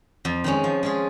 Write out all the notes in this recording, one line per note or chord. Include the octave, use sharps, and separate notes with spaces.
F2
D#3 G#3 C#4
F3
G#3 C#4 F4 G#4